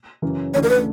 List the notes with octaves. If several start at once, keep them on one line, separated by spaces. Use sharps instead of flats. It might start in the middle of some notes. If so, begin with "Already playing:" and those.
F#2 C#3 E3
D2 C#3 E3 A3 D4 C#5
A#4
B4